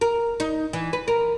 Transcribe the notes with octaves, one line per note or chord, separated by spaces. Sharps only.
A#4
D#4
E3
B4
A#4